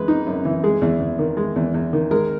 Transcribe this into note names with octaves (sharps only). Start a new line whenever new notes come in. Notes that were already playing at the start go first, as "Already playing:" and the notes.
Already playing: F#2 E3 G#3 B4
D#4
F#2
E3
G#3 G#4
E2
E2
D#3
G#3
E2
E2
D#3
G#3 A#4